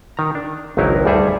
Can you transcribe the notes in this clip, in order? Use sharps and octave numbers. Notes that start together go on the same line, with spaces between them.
D#3 A#5
D4
G#1 C#2 F#3 D#4 E4 A#4
D2 G2 G3 G#4 A4 E5